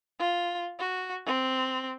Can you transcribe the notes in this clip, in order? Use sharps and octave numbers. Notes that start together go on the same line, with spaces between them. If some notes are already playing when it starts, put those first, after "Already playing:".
F4
F#4
C4